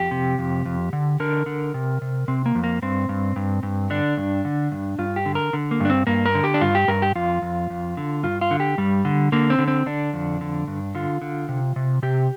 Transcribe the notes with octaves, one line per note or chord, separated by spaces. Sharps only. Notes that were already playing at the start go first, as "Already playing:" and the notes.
Already playing: F2 G4
C3
F2
F2
D3
D3 A#4
D3
C3
C3
C3 C4
A#3
F2
A#3
G2 C4
G2
G2
G2
D3 D4
G2
D3
G2
G2 F4
G4
D3
A#4
D3
A#3
G2 D4
C4
G2 A#3
A#4
D3
G4
D4
G2 F4
G4
G2 A#4
G4
F2 F4
F2
F2
D3
G2 F4
F4
D3
G4
G2 G3
D3
D3 A#3
C4
D3
C4
D3 D4
F2
D3
G2
D3 F4
D3
C3
C3
C3 G4